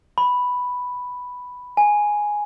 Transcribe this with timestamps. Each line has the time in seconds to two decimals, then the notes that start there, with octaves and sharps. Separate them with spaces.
0.18 B5
1.77 G#5